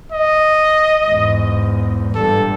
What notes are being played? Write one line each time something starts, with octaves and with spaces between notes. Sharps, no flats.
D#5
E2 G#2
G2 A#2 A4